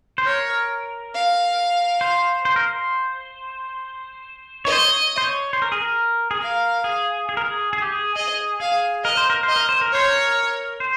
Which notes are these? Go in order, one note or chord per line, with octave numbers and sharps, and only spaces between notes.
C5
A#4 C#5
F5
C5
C5
A#4
C5
C#5 D#5
C5
C#5
C5
C#5
C5
A#4
G#4
A#4
G#4
A#4 F5
G#4
G#4
A#4
G#4
G#4
G4
G#4
G#4 D#5
G#4 F5
A#4 D#5
C5
A#4
C5
D#5
A#4
C5
A#4
C5 C#5
A#4
C5